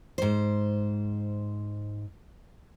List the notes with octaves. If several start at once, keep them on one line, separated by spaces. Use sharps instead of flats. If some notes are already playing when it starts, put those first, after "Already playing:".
G#2 C5